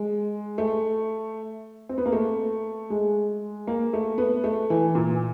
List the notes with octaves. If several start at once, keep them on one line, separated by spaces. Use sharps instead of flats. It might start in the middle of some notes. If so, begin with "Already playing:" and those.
Already playing: G#3
A3
C4
B3
A#3
A3
G#3
A#3
A3
B3
A3
E3
A#2